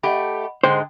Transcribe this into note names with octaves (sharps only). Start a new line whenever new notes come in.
A3 G4 D#5 F#5 B5
G#2 D3 G#3 C5 G5